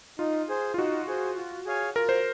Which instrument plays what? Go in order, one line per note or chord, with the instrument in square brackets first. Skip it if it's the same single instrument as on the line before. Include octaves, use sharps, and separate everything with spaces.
[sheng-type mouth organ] D#4 [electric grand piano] F4
[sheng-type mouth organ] G#4 C5
[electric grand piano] F4
[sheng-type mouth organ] D#4 [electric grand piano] F#4
[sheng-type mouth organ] G#4 C5
F4
G#4 C#5 F5 G#5
[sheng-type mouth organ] F4 [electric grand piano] A#4
[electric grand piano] C5